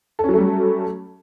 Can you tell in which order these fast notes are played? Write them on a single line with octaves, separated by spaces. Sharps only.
A4 C#4 F#3 A3 G3